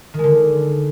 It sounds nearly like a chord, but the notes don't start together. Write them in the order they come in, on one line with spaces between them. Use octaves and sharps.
D#3 G#3 D3